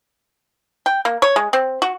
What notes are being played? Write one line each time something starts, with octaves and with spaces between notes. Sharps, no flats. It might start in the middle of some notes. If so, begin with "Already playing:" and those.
G5
A#3
C#5
G#3
C4
F#4